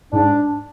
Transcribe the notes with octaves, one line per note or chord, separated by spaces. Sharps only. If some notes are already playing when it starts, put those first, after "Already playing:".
G#2 D4